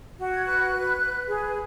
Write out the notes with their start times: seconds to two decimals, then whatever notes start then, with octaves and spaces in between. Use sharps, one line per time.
0.18 F#4
0.33 G#6
0.45 B4 F#6
0.73 B4
1.01 B4
1.28 G#4